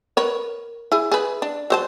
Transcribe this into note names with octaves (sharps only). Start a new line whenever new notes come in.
A#4 B4 C#5
E4 G#4
G#4 B4
D4
F#3 C5 A5